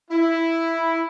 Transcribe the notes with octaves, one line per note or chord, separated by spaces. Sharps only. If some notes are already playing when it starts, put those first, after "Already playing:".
E4